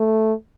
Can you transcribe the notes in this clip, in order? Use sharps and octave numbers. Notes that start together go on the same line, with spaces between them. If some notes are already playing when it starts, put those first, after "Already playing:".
Already playing: A3